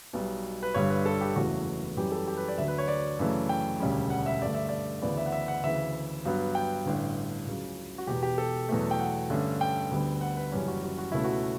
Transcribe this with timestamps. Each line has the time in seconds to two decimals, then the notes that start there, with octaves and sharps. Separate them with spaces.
0.13 B1 B2 G3
0.63 B4
0.74 G1 G2 D3 G3 C#5
0.90 B4
1.05 A4
1.21 G4
1.35 F#1 E2 C#3 E3 A3 F#4
1.97 F#2 E3 G3 G4
2.12 A4
2.28 G4
2.37 B4
2.48 D5
2.58 D2 D3 F#3 E5
2.68 B4
2.78 C#5
2.88 D5
3.19 F#2 C#3 E3 A3
3.49 G5
3.80 E1 D2 C#3 G3 C#4
4.10 F#5
4.26 E5
4.42 G2 D3 A3 D5
4.55 E5
4.69 D5
5.02 D2 C#3 E3 B3 D5
5.17 E5
5.26 F#5
5.32 E5
5.48 F#5
5.63 D2 C#3 E3 E5
6.25 G2 F#3 B3
6.55 G5
6.86 A1 G2 D3
7.47 C#2 C#3 F#3
7.98 F#4
8.07 E1 E2 B2 G4
8.23 G4
8.38 A4
8.69 E2 B2 F#3 A3
8.91 G5
8.99 F#5
9.30 G2 D3 A3 C#4
9.61 G5
9.91 D2 D3 G3 B3
10.21 F#5
10.37 B4
10.52 F#1 F#2 E3 G3 C#4
10.68 F#4
10.83 F#4
10.98 F#4
11.12 C#2 B2 A3 C#4 E4
11.24 F#4